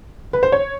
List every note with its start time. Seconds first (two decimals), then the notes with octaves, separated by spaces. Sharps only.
0.33 B4
0.43 C5
0.52 C#5